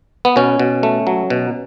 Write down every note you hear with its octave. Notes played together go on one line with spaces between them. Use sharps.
B3
B2 C#4
B2
A3
F#3
B2